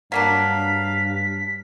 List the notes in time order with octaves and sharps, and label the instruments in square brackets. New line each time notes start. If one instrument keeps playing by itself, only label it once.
[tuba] G2 [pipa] F#3 A#3 D4 [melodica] F5 [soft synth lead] B6